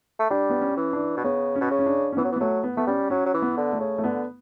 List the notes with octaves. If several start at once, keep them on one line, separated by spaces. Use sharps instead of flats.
A3
G3 D4
B3
C#4
E3
D4
B2
C#3 B3
C#4
B2
C#3
C#4
D4
C#4
E3 B3
F#3
E3
B3
F#3 A3
B3
A3 B3
G3 C#4
F#3 C#4
F#3
E3
B3
D3
A3
C#3
A3
D3 B3